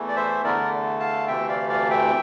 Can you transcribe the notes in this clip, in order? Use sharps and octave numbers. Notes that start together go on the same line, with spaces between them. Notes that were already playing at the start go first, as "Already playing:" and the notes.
Already playing: E2 E3 A3
D5
C5 E5
E2 D3 A3 A#4 D5
F5 A5
D2 C3 E3 A3 E5 G5
D5 F5
D5 F5
E5 G5